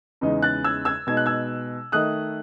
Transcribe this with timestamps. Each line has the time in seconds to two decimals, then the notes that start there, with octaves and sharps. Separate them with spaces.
0.21 E2 C#3 G#3 D#4
0.42 F#6 A6
0.64 E6 G#6
0.85 E6 G#6
1.07 B2 G#3 D#4 G#6
1.17 F#6
1.26 E6 G#6
1.92 D#3 A3 D#4 D#6 F#6